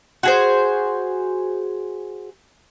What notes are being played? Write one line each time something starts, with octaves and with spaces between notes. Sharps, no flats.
F#4 G#4 C5